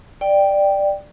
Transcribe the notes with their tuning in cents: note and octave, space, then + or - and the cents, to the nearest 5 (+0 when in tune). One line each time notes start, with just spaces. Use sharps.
D5 +10 G5 +0